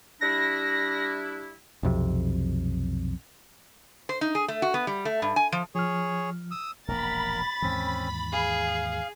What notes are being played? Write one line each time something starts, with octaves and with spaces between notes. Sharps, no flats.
G3 D4 E4 A#6
B1 F2 C3
C5
D#4
G#4
A3
F#4
B3
G3
A3
G2
G#5
F3
F3 G#4 C#5 F6
D#6 E6
E1 A#1 A#3 A#4 B5 A6
D#2 G#2 E3 C4 C#4
G#4 F5